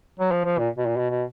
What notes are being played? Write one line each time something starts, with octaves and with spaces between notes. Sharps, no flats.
F#3
F3
F3
A#2
B2
A#2
B2
B2